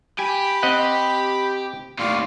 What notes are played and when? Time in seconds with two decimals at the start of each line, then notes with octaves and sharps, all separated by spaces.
0.19 G4 G#5 B5
0.63 C4 D#5 F#5
1.99 D#2 A2 D5 F5 C6